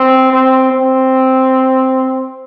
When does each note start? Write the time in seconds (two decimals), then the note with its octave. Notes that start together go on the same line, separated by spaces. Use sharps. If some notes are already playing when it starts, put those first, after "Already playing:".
Already playing: C4
0.32 C4
0.72 C4